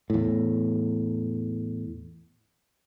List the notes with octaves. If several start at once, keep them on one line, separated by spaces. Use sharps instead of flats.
E2 A2